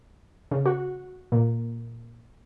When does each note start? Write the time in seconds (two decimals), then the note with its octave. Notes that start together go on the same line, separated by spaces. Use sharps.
0.51 C#3
0.66 F#4
1.32 A#2